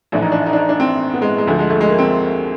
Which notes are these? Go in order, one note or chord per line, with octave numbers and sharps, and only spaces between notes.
A#1 A2 E3 D4
D#4
D4
D#4
D4
D#4
D4
C4
B3
G#3
G#3
D2 D3 F3
G#3
A3
G#3
A#3
C4